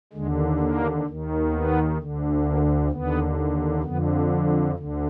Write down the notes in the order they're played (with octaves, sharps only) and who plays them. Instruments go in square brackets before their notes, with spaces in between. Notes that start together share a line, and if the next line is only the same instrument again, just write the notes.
[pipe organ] D#2 D3 G#3
A#3
D#2 D#3
B3
D2 D3
A#3
D#2 D3 B3
F2 D3 B3
D2 D3